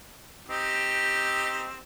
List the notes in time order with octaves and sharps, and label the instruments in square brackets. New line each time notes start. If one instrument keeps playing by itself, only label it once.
[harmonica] C4 D#4 G4